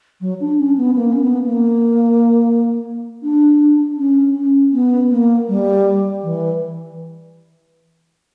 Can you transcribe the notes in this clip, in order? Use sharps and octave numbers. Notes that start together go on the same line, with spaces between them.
F#3
D4
C#4
B3
A#3
C#4
B3
A#3
D4
C#4
C#4
B3
A#3
G3
E3